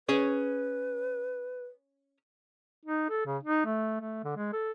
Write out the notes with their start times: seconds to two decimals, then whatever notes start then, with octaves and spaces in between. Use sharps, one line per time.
0.09 C#4 G#4 B4 C#5
2.85 D#4
3.10 A4
3.26 C#3
3.43 D#4
3.65 A3
4.00 A3
4.24 D3
4.37 G#3
4.53 A4